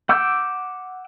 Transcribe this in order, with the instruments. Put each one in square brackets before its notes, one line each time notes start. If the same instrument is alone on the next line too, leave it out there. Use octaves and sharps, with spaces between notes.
[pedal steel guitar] F#5 D6 E6 G6